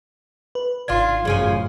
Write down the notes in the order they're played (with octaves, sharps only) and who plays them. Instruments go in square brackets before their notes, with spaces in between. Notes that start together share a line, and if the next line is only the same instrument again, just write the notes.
[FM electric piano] B4
[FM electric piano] G#1 F5 G#6 [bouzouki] D4 F4
[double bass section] A1 F#2 [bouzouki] C#3 F3 G#5